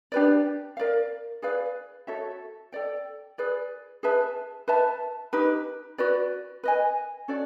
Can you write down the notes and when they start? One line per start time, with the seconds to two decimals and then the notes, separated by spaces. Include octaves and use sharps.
0.12 D4 G4 B4 D5
0.77 A#4 D5 F5
1.42 G#4 B4 D5 F5
2.07 F#4 A4 C#5 E5
2.72 A4 D5 G5
3.38 G#4 B4 D5
4.03 G#4 B4 E5 A5
4.68 B4 E5 A5
5.33 D#4 G4 B4
5.98 F#4 B4 D5
6.63 B4 D#5 G#5
7.28 C#4 F#4 A4 D5